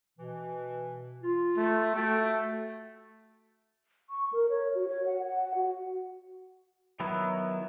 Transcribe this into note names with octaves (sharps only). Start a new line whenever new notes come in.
B2 E3
F4
A3
A3 F#4 G5
C#6
A#4
C#5
F#4
C#5
F#5
F#5
F#4
D#3 F#3 B3 E4